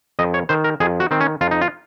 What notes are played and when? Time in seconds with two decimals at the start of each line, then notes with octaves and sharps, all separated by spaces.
0.19 F2 D#5
0.34 C#5
0.49 D#3 C5
0.64 A#4
0.80 F2 G#4
1.00 F#4
1.11 D#3 C4
1.21 C#4
1.41 F2 F4
1.51 D#4
1.61 F4